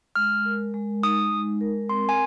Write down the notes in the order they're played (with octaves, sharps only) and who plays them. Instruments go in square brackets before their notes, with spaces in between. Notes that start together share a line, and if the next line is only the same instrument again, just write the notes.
[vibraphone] G#3 [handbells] F6
[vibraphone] A#4
G#3
[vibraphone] D#4 [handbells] D#6
[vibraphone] G#3
A#4
[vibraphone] C4 [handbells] C6
[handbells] G#5